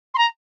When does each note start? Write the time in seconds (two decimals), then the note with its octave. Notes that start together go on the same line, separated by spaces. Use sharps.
0.14 C6
0.18 A#5